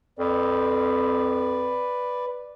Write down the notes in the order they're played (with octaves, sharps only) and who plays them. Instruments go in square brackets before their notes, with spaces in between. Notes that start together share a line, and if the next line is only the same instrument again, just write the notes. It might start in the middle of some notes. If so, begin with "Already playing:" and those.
[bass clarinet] F2 [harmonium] B4 D5